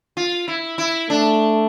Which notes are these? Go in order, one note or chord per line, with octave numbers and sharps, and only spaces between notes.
F4
E4
E4
A3 D4